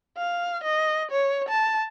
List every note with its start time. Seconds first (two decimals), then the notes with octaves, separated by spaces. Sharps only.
0.17 F5
0.64 D#5
1.11 C#5
1.49 A5